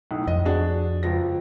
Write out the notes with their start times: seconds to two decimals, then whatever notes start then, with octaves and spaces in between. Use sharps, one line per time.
0.11 B1 A2
0.27 F2 D#5
0.45 D4 F#4 G#4
1.03 C#2 F3 A#6